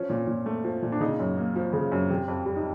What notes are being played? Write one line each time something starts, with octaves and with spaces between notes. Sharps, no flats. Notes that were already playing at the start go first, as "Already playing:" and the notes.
Already playing: F3 C#4
A#2
A#2
A3
F3
A#2
D4
C#3 D#4
F#2
A#3
F3
C#3
F#2
C3
F2
G3
D#4